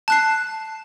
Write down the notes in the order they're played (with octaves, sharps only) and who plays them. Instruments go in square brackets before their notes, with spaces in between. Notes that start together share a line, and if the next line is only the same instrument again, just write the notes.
[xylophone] A5 F#6 C7